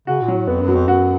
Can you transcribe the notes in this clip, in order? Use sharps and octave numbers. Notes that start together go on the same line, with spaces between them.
C#3 F#4
A#2
F#3
A2
F2 B3
F#2
F#3
F2
F#2 F#4